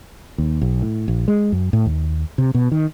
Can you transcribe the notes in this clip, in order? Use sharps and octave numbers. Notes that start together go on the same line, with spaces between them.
D#2
B1
A2
A#1
G#3
F#2
A2
D#2
C3
B2
D#3